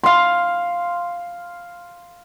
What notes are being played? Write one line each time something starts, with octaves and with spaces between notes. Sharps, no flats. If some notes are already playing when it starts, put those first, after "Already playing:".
F5 C6